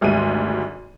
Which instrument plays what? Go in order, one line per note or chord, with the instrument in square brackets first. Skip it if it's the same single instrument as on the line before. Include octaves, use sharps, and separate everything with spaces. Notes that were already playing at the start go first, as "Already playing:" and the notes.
[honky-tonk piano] G#1 D2 G#2 G3 D#7